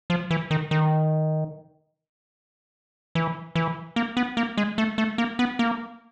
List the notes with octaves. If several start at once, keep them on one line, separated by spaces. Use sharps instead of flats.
F3
E3
D#3
D#3
E3
E3
A#3
B3
A#3
G#3
A3
A3
A#3
B3
A#3